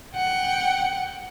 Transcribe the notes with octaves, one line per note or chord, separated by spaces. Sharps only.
F#5 G5